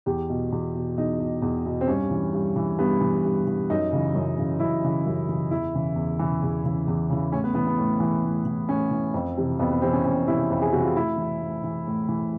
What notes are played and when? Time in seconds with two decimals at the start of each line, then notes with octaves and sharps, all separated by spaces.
0.06 E2 G4
0.30 B2
0.52 E2
0.75 B2
0.98 E2 D#4
1.19 B2
1.42 E2
1.66 B2
1.81 C4
1.88 G2 C#4
2.10 E3
2.33 G2
2.56 E3
2.79 G2 B3
3.01 E3
3.24 G2
3.47 E3
3.70 F#2 D#4
3.92 C#3 E3
4.15 F#2
4.38 C#3 E3
4.60 F#2 E4
4.83 C#3 E3
5.06 F#2
5.29 C#3 E3
5.51 E2 E4
5.74 C#3 E3
5.96 E2
6.19 C#3 E3
6.42 E2
6.64 C#3 E3
6.88 E2
7.10 C#3 E3
7.32 A2 C#4
7.44 B3
7.55 E3 B3
7.67 B3
7.78 A2
8.00 E3
8.24 A2
8.45 E3
8.69 A2 C#4
8.91 E3
9.14 F2
9.37 C3 E3
9.59 F2 B3
9.71 B3
9.82 C3 E3 C4
9.93 C#4
10.05 F2 C#4
10.27 C3 E3 E4
10.50 F2
10.61 G#4
10.72 C3 E3 F#4
10.84 F4
10.95 A2 E4
11.18 E3
11.41 A2
11.64 E3
11.87 A2
12.08 E3